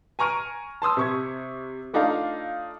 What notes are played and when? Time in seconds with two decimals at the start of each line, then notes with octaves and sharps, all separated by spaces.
0.19 G#5 A#5 C#6 F6 D7 D#7
0.82 A5 C6 D#6 E6
0.97 C3 C#6 G#6
1.93 A3 D4 D#4 F4 A4 F5